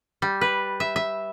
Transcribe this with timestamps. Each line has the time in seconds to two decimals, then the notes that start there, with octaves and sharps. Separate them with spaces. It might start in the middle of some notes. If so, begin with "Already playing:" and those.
0.22 G3
0.41 B4
0.80 E5
0.96 E5